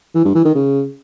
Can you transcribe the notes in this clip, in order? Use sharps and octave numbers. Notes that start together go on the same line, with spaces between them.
E3
G2
E3
D#3
C#3